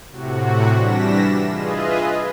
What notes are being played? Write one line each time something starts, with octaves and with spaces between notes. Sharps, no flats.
A2 C3 F#4
E3 G3 D4 A#6 B6 E7
F4 G#4 B4 D#5 E5